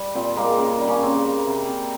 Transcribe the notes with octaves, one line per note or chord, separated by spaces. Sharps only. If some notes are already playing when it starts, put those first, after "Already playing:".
Already playing: G3
A#2 C4
G#3 A#3
C#3 A#3
G3
A#3 C#4
C#3 C4
G3
C3
C3